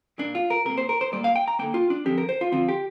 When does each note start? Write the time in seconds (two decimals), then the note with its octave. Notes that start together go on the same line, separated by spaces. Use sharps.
0.18 A#2 A#3 D4
0.35 F4
0.50 A#4
0.65 C3 A#3 A#4
0.78 C5
0.89 A#4
1.01 C5
1.12 A#2 G3 A#3 D5
1.24 F5
1.36 G5
1.48 A#5
1.59 D3 A#3 G5
1.74 F4
1.90 D4
2.06 D3 F3 C4 G4
2.18 A#4
2.29 C5
2.41 F4
2.52 D3 F3 C4 F4
2.69 G4